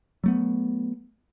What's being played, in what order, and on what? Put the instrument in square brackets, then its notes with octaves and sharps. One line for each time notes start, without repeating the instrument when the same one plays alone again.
[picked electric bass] F#3 A3 B3